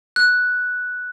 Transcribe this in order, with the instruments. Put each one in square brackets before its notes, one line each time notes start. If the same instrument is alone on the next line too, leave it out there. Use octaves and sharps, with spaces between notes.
[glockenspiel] F#6